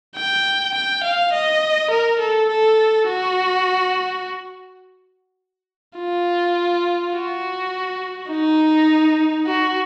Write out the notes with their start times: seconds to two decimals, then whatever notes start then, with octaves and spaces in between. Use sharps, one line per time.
0.16 G5
0.74 G5
1.03 F5
1.32 D#5
1.90 A#4
2.19 A4
2.49 A4
3.07 F#4
5.97 F4
7.13 F#4
8.29 D#4
9.46 F#4